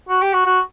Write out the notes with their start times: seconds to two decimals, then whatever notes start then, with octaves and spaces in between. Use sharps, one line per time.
0.09 F#4
0.22 G4
0.33 F#4
0.46 F#4